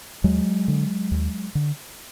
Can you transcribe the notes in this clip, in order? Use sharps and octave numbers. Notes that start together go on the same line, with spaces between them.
D#2 F#3 G#3
D3
D#2
D3